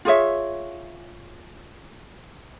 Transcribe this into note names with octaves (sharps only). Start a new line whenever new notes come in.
F4 G#4 C#5 E5